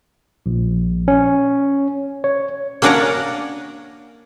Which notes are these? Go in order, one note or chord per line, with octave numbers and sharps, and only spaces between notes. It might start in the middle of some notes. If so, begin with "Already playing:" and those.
A#1
C#4
C#5
A#3 C#4 D4 A#4 F#5 A#5